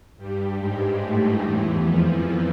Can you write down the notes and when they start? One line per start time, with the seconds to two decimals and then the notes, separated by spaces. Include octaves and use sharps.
0.18 G2 G3
0.59 G#2 G#3
1.01 A2 A3
1.42 E2 E3
1.83 F2 F3